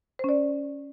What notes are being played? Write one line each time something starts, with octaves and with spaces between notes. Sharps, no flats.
C#4 C5 D5